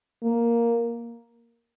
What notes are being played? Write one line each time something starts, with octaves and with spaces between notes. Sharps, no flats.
A#3